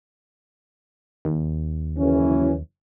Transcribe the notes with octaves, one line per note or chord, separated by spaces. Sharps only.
D#2
F#1 E3 C#4